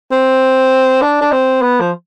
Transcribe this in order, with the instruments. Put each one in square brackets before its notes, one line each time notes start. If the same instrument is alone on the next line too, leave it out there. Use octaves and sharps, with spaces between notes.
[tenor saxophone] C4
D4
D4
C4
B3
F3